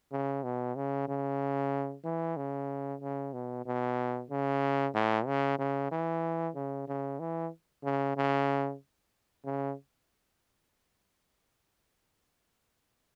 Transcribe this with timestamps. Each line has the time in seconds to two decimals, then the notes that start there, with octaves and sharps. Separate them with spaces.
0.12 C#3
0.44 B2
0.76 C#3
1.09 C#3
2.04 E3
2.37 C#3
3.01 C#3
3.33 B2
3.66 B2
4.30 C#3
4.94 A2
5.26 C#3
5.58 C#3
5.91 E3
6.55 C#3
6.88 C#3
7.19 E3
7.83 C#3
8.17 C#3
9.45 C#3